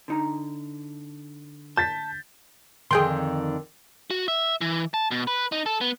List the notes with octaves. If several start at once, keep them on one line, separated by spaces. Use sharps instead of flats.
D3 D#4 A#5
A5 G6 A6 B6
F2 D3 D#3 G#4 G5 C6
F#4
E5
E3
A5
B2
B4
D#4
A4
B3